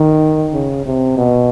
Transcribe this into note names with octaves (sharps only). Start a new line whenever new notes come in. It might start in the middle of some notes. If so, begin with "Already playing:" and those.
Already playing: D#3
C#3
C3
B2